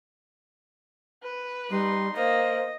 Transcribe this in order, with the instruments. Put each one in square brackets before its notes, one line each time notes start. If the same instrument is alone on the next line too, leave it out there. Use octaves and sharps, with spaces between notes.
[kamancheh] B4
[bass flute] G3 [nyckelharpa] D#4 C6
[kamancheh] A#3 [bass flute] C5 [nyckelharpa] D#5